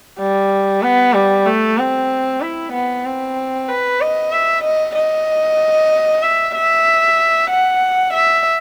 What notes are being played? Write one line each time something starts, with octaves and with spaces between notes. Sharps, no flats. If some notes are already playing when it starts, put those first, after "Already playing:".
G3
B3
G3
A3
C4
E4
B3
C4
B4
D#5
E5
D#5
D#5
E5
E5
F#5
E5